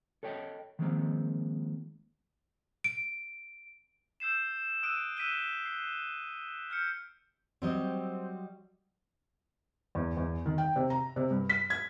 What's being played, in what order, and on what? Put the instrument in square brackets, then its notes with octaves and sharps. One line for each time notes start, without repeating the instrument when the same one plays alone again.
[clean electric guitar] A4 C#5 D#5 G5
D#3 F3 G#3 A#3 C4
[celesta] D7
[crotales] E6 G6 C7 E7
D#6 E6 F#6 D7 D#7
E6 F#6 B6 D7 D#7 G7
C7
F6 G6 C#7
[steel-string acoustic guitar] F#3 G3 D#5 [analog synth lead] C4
[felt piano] E2
E2
D#3
G5
C3
A#5
C3
G2
B6
G#6